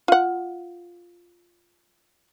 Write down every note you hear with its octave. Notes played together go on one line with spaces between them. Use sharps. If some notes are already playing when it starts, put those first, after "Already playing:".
F4 F#5